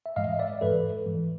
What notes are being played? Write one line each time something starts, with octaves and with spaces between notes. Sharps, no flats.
E5
G#2 E3 G#3 D#5 F5
D5 E5
G#2 E3 G#3 A4 B4
G#2 E3 G#3